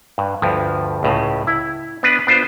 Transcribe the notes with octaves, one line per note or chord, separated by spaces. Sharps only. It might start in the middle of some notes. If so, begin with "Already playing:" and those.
G2
D2 G2 F3
C#2 A2 C#3
E4
B3 D4 B4
B3 D4 F4 C5